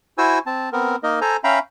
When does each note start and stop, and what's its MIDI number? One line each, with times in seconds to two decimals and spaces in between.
0.18 0.39 64
0.18 0.39 66
0.18 0.39 72
0.18 0.39 80
0.18 0.39 88
0.46 0.69 60
0.46 0.69 81
0.73 0.96 59
0.73 0.96 60
0.73 0.96 70
1.03 1.20 58
1.03 1.20 63
1.03 1.20 70
1.03 1.20 75
1.21 1.37 69
1.21 1.37 72
1.21 1.37 80
1.21 1.37 82
1.44 1.59 61
1.44 1.59 76
1.44 1.59 77
1.44 1.59 79
1.44 1.59 82
1.44 1.59 83